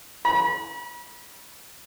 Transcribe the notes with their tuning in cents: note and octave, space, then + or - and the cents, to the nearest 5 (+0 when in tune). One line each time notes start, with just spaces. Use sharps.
B5 -40